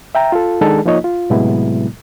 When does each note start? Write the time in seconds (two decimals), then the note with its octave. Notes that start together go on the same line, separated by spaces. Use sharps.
0.15 E5 G5 A#5
0.32 F4 A4
0.61 D#3 G#3 D4 D#4 G#4 A4
0.85 F3 A#3 D#4 F4 C#5 D#5
1.04 F4
1.30 A2 C3 F#3 G#3 B3 E4